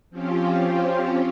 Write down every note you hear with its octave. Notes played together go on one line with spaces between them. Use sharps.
F3 C4 C#4 F4 G4